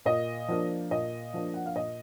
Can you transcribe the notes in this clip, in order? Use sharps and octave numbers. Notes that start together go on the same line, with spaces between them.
A#2 D#5
F3 A#3 D4
A#2 D#5
F3 A#3 D4
F#5
F5
A#2 D#5